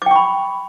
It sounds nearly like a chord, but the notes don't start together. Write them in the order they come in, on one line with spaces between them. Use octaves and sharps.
D6 G5 C#6 B5